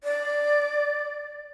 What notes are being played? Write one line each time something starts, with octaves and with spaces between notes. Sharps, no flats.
D5